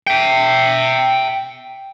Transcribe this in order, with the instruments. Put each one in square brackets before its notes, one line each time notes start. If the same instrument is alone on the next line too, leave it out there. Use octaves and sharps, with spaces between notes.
[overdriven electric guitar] E5 G5